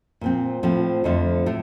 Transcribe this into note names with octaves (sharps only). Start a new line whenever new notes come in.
A#2 F3 C4
A2 F3 C4
F2 D3 F3 A3
A2 A3